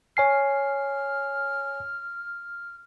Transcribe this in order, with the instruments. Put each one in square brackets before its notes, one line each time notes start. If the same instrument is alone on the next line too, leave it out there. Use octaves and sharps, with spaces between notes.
[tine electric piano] C#5 G#5 C7 [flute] F6